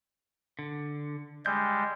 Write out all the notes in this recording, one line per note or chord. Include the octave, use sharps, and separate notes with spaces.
D3
G3 G#3 G6